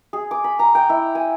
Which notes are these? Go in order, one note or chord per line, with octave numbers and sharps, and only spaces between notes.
G#4
D6
B5
A#5
G5
E4
G#5